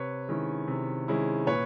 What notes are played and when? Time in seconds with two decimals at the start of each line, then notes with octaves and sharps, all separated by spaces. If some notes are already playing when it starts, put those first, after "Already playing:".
Already playing: C3 B4 C#5
0.28 D#3 G#3 C#4 E4
0.68 C3
1.08 D#3 G#3 C#4 E4
1.46 A#2 B4 C#5